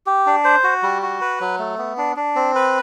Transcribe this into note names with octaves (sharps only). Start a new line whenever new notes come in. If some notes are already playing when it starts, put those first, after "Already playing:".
G4
D4
C5
F#4
G3
F#4
B4
F#3
A3
B3
D4
D4
C4
B4